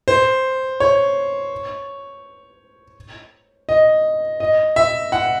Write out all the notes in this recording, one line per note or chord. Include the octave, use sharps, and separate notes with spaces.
C5
C#5
D#5
D#5
E5
F#5